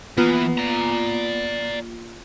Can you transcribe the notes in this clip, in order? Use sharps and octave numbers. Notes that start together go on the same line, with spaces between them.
E3 A#3 B3 F4 B4
D5 A#5